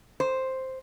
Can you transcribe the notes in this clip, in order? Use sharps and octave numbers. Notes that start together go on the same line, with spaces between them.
C5